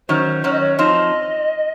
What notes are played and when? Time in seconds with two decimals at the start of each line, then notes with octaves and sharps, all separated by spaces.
0.09 D#3 F#3 C#4 C5
0.44 D#3 F#3 C#4 C#5
0.52 D#5
0.60 C#5
0.78 F3 C4 D#4 D#5